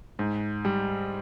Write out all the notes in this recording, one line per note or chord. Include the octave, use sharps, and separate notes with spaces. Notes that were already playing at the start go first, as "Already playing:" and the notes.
G#2
G3